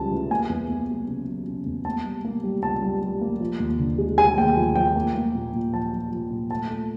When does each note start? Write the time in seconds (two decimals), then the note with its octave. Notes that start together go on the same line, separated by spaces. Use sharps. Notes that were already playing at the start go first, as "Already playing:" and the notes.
Already playing: C#2 C#3 E3 G3 A5
0.11 E3
0.30 A#3 G#5
0.49 E2
0.70 A#3
0.89 F#3
1.08 C#3
1.28 F#3
1.47 C#3
1.66 E2
1.85 A#3 A5
2.05 G3
2.25 A#3
2.43 G3
2.63 C#2 A5
2.82 G3
3.02 G3
3.21 A#3
3.40 F3
3.60 D#2
3.79 D3
3.98 G#3
4.18 G#3 G#5
4.38 D#2 G5
4.56 F3
4.76 F3 G5
4.96 A#3
5.15 A#3
5.35 A#2
5.53 A#2
5.74 F3 A5
5.93 F3
6.11 F3
6.30 A#2
6.50 A3 A5
6.70 A3